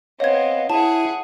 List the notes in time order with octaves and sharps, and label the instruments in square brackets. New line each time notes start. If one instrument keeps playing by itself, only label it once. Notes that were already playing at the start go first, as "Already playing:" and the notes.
[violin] B3 C4 [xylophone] C#5 G#6 [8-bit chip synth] D#5 F5
[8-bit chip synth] E4 E5 [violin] G#4 F#5 [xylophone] A5